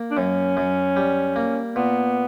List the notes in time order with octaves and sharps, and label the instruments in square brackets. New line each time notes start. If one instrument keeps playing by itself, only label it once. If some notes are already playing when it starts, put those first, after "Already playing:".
Already playing: [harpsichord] A#3
[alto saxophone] D4
[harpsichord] F#2 [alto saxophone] C#4
[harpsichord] F#2
G3
A#3
[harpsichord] A#2 [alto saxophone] B3